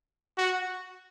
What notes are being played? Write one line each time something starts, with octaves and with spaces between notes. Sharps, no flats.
F#4